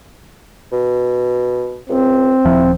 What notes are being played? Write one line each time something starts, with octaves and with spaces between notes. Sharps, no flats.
B2
C#2 C4
D#1 F3 E4